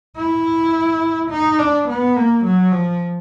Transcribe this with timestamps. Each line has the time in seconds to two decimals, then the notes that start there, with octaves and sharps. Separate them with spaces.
0.17 E4
1.30 D#4
1.59 D4
1.88 B3
2.16 A#3
2.44 F#3
2.72 F3